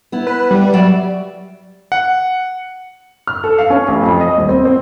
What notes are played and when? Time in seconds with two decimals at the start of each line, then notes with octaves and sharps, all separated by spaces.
0.12 B3 E4
0.27 B4
0.51 G3
0.73 F#3 D5 E5
1.92 F#5
3.27 F6
3.44 A4
3.58 F5
3.70 C#4
3.88 A1
4.02 F2
4.21 D#5
4.37 D#1
4.49 C4
4.65 C4